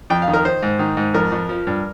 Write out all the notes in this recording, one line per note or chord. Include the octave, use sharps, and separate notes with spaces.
F2 G5
F5
D#3
A#4
D#3 C5
G#2
D#3
G#2
F2 A#4
F2
F3
G2